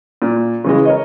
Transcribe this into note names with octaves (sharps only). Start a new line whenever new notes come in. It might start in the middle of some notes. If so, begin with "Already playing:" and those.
A#2
C#3 E3 G#3
A#4 C#5 D#5